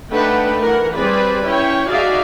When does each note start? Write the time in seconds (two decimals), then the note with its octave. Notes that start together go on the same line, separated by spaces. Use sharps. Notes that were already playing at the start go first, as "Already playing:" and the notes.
0.12 A3 D4 D#4 B4 F#5 G5
0.61 E3 A#4 F#5
0.95 G3 C4 G#4 B4 D5
1.46 C#4 E4 C#5 G5
1.88 D#4 F#4 G#4 D5 E5 F5